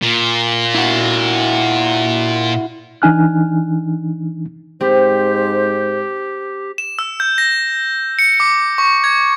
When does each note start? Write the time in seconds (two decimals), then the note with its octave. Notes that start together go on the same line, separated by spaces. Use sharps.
0.02 A#2
0.74 E4 F#4
3.02 E3 D4 D#4 G#5 F6 F#6
4.81 G#2 C4 G4 C5
6.78 E7
6.99 E6
7.20 G6
7.38 A#6
8.19 C#7
8.40 D6
8.78 C#6
9.04 G#6